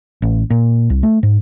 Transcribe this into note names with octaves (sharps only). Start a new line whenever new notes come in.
A1
A#2
C2
A3
G#2